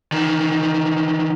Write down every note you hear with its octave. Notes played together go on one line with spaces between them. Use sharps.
D#3 E3